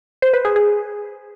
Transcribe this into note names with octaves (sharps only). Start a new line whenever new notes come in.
C5
B4
G#4
G#4